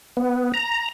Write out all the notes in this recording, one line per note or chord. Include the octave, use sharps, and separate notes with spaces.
B3
A#5